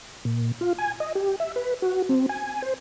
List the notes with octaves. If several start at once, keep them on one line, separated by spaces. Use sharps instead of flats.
A#2
F4
G#5
D#5
G4
E5
B4
F#4
C4
G#5
C5